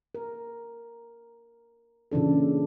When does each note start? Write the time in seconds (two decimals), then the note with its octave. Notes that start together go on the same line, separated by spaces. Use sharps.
0.15 A#4
2.12 A#2 C#3 E3 D4 A4